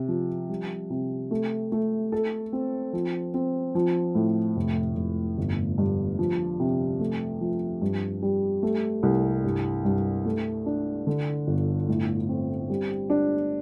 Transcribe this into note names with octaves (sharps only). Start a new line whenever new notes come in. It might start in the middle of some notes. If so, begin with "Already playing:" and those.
Already playing: C3
F3
G3
C3
A3
A3
A4
C4
F3
C4
F3
A2
F1
F1
G1
G2
F3
C3
A3
F3
G2
G3
A3
C2
G2
G2
A3
D4
D3
G1
A2
C4
G3
D4